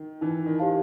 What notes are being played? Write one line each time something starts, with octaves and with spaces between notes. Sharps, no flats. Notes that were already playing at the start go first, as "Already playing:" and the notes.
Already playing: D#3
E3 D#4
D#3
G4 C5 F5 A5